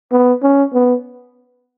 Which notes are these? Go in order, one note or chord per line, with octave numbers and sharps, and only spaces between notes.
B3
C#4
B3